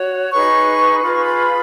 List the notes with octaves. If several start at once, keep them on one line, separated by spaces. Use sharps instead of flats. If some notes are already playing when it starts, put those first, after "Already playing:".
Already playing: F#4 C#5
D#4 G#4 B4 C#6
F4 G#4 B4 B5
C#6
B5